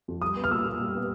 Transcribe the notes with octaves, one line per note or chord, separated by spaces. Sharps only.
F2
G3 D#6
B3
F6
A#2 E6
A#2
G3
B3